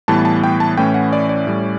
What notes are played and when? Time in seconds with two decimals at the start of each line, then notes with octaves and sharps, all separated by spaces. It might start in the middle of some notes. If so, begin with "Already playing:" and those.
0.08 A2 E3 G3 B3 A5
0.25 A5
0.44 G5
0.60 A5
0.77 A2 E3 A3 C#4 G5
0.94 F#5
1.12 D5
1.29 D5
1.47 A2 G3 C#4